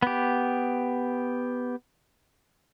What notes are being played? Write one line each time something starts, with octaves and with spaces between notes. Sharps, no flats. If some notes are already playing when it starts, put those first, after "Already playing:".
B3 G4